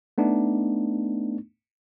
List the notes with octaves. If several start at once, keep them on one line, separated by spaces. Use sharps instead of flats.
A3 B3 D4 D#4